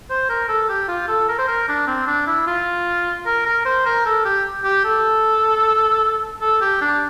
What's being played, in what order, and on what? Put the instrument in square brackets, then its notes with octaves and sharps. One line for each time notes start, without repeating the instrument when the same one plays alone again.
[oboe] C5
A#4
A4
G4
F4
A4
A#4
C5
A#4
D4
C4
D4
E4
F4
A#4
A#4
C5
A#4
A4
G4
G4
A4
A4
G4
D4